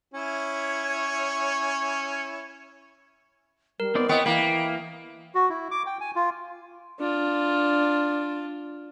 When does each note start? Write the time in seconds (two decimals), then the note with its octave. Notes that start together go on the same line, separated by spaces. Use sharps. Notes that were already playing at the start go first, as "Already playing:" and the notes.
0.14 C#4 E4 C#5
3.80 G3 A#4
3.95 B3 C4 D#4 D5
4.09 B3 C4 E4 C#5 D#5 G5
4.26 E3 A#3 B5
5.35 F#4
5.50 E4
5.71 D6
5.86 G5
6.00 G#5
6.16 F4
6.99 D4 F4